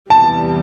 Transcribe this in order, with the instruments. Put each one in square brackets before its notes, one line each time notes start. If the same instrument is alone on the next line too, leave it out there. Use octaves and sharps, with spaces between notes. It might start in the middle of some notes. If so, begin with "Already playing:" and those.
[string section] E2 C3 E3 G3 B3 [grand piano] A5